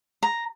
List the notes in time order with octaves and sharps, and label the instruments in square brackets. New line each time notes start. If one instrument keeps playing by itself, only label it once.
[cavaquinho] A#5